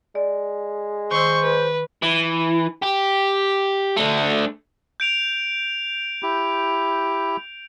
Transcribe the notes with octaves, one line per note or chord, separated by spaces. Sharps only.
G#3 D5
D#3 C5 C6 C#6 E6
B4
E3
G4
A3 D4
G6 D7 F7
E4 G4